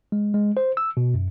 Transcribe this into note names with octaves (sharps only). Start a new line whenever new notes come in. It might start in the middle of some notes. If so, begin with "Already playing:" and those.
G#3
G#3
C5
E6
B2
F#2